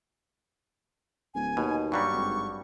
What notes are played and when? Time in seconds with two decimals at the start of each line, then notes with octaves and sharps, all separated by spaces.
1.35 D1 G#5
1.57 D#2 B2
1.92 G2 F#3 G3 C#6
2.13 G#1